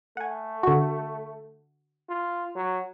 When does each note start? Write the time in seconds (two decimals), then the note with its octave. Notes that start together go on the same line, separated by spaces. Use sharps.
0.17 A3 F#5 G#5
0.63 D3 F#4
2.09 F4
2.56 F#3